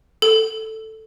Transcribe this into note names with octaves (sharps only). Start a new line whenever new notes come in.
A4